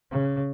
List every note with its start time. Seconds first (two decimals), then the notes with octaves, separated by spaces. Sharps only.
0.11 C#3